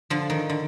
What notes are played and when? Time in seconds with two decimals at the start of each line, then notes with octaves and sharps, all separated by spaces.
0.10 D3 F3
0.30 D#3
0.50 D3